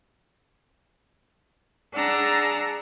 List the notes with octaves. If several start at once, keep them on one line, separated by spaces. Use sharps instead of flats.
D4 G#4 F#5 A#5 E6 A6